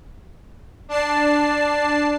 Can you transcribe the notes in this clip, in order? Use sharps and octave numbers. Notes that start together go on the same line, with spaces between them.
D4 A5 C7